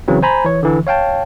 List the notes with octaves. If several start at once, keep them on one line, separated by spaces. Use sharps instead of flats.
C#3 E3 F#3 C4
C5 G#5 A#5 B5
E3 C#5
D3 E3
C#5 F5 G5 A5